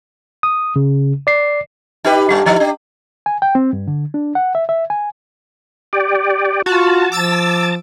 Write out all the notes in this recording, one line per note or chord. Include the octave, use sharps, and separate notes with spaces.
D#6
C#3
D5 C7
D#4 G4 B4
G2 G3
F3 D#4 E4
D4 G4
G#5
G5
C4
G2
D3
D4
F#5
E5
E5
G#5
G4 D5
F4 F#4 A5
F3 D6 E6 A6